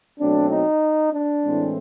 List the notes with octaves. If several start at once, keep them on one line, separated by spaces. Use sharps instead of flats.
B2 F#3 A3 C4 D4
D#4
D4
A2 E3 G#3 C4